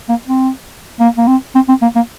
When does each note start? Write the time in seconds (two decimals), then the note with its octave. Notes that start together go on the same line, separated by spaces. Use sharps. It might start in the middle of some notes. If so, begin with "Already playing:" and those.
0.09 A#3
0.27 C4
1.00 A#3
1.17 A#3
1.27 C4
1.55 C4
1.69 C4
1.82 A#3
1.96 A#3